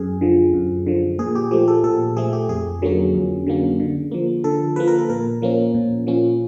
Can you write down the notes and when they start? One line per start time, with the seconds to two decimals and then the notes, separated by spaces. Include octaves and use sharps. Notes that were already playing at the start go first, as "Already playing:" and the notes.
Already playing: F#2 G#4
0.21 D3 F3
0.54 F#2
0.86 D3 F3
1.19 A#2 G#4
1.35 G4
1.51 F3 A3 G4
1.68 A4
1.84 A#2 A4
2.17 F3 A3 G#4
2.33 G4
2.49 F2 G#4
2.82 D3 F#3 A#3 C#4
3.14 F2
3.46 D3 F#3 A#3 C#4
3.80 D3
4.11 F3 A#3
4.44 D3 A4
4.76 F3 A#3 B4
4.88 A#4
4.99 A4
5.10 A#2 A#4
5.42 F3 A#3 C#4
5.74 A#2
6.07 F3 A#3 C#4